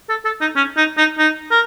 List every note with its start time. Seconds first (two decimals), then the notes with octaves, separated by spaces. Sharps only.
0.09 A4
0.25 A4
0.41 D#4
0.56 C#4
0.77 D#4
0.98 D#4
1.19 D#4
1.51 A#4